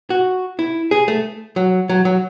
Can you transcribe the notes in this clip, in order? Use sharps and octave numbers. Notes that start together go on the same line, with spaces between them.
F#4
E4
G#4
A3
F#3
F#3
F#3